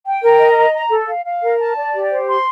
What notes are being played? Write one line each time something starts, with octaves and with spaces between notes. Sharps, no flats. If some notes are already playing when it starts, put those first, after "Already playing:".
G5
A#4
D#5
A#5
A#5
A4
F5
F5
A#4
A5
D5
G4
C5
C6